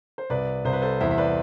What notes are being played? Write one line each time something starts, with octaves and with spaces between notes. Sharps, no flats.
C5
C2 B4 D5
C2 C5
B4
A4 C5
E2 C5 E5
E5
B4 D5